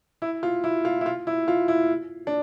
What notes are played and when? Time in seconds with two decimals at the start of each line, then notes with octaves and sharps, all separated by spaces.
0.22 E4
0.43 F4
0.64 E4
0.85 F4
1.01 E4
1.06 F4
1.27 E4
1.48 F4
1.68 E4
2.27 D4